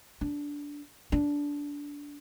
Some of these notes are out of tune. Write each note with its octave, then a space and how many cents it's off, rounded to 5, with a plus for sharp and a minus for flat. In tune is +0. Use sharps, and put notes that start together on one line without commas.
D4 -15
D4 -20